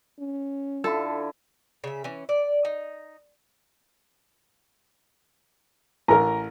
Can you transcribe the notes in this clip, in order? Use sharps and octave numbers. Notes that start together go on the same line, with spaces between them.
C#4
D3 E4 F4 A4
C#3 E5
E3 C#4
D5
D#4
A1 A#4 A#5